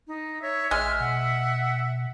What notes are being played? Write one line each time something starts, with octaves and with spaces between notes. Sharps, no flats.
D#4
C#5 E5
A1 G#3 F6
B2 F#5